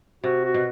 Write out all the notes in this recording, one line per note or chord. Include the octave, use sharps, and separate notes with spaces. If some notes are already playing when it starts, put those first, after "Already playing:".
C3 F#4
F#4
B2